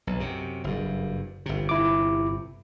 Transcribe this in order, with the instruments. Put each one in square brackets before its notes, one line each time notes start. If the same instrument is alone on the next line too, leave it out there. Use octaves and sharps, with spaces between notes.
[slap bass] B1
F#2 C3
F#1 G2
G1 C3
[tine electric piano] E4 D6